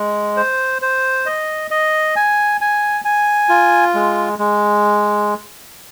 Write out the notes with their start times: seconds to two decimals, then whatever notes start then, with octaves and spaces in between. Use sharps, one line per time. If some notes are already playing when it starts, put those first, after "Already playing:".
Already playing: G#3
0.37 C5
0.82 C5
1.26 D#5
1.71 D#5
2.16 G#5
2.61 G#5
3.05 G#5
3.49 F4
3.95 G#3
4.39 G#3